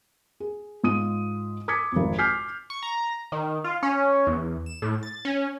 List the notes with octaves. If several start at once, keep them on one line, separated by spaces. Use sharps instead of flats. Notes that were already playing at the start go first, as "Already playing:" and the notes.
G#4
G#2 F4 D#6 D#7
D6 D#6 G#6 A6 B6 C#7
G#1 F2
D6 F6 G6 B6 C7
C#6
A#5
D#3
F4
C#4
E2
E7
A2
A6
C#4